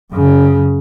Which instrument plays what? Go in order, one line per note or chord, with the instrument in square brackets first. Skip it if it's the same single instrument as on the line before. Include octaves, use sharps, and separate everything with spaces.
[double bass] F#2 C#3